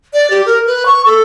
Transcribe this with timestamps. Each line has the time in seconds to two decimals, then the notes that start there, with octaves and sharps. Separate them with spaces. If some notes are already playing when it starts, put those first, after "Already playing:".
0.13 D5
0.30 G4
0.46 A#4
0.67 B4
0.86 C#6
1.06 A4